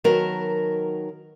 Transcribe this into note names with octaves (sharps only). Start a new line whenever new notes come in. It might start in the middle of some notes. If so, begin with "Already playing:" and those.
D#3 F#3 B3 A#4 A5